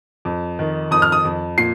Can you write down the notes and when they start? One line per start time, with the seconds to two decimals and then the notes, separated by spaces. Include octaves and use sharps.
0.25 F2
0.59 D#3
0.91 F2 D#6
1.02 F6
1.12 D#6
1.25 F2
1.58 A#2 C7